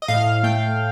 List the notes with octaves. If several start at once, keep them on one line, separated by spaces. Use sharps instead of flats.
D#5
A2 F5
A3 G5